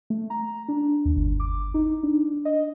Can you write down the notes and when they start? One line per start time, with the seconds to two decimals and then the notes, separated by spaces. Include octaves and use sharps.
0.10 A3
0.30 A#5
0.68 D4
1.05 D#2
1.17 G1
1.40 D6
1.74 D#4
2.03 D4
2.45 D#5